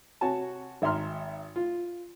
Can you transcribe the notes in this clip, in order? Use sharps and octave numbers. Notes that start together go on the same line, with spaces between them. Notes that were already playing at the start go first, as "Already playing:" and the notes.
C3 F#4 C#5 G#5 A5
G#1 E5 A#5 C6 F6
F4